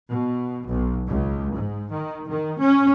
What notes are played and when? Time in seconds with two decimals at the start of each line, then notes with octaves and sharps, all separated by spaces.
0.10 B2
0.68 B1
1.08 C#2
1.54 G#2
1.93 D#3
2.30 D#3
2.61 C#4